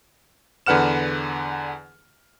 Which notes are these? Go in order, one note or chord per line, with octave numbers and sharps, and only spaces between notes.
E2 D3 B4 F#5 F6 E7